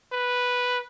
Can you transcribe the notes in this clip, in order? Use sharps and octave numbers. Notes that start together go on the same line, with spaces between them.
B4